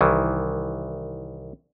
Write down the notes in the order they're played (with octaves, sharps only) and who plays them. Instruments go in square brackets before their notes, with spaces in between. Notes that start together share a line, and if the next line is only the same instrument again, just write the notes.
[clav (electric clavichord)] C2 D#3 E3